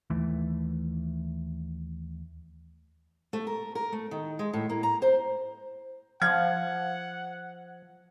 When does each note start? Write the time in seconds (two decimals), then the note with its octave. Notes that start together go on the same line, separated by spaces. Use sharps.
0.10 D#2 E3 A3
3.33 A3
3.47 A#4
3.75 A#4
3.92 A3
4.11 D#3
4.39 G#3
4.54 A2
4.70 A#3
4.83 A#5
5.02 C5
6.22 F3 F5 F#5 G#6